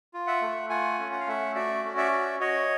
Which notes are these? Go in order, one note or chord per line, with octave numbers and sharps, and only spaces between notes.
F4
E5 F#5
A3
F4 F#5 G#5
C#4
F#5
F5
A3 E5 F#5
F#4 D5 E5
C#4
D5 E5
F#4
F#4 C#5 D#5